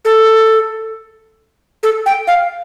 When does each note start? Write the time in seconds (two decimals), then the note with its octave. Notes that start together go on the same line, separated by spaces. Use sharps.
0.05 A4
1.83 A4
2.06 G5
2.27 F5